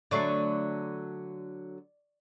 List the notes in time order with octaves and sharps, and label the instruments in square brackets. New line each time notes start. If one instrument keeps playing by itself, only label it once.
[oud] D3 F#3 A3 [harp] D5 C#6 C7